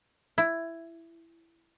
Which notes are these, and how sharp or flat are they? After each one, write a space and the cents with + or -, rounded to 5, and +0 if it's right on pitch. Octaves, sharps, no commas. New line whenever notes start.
E4 +10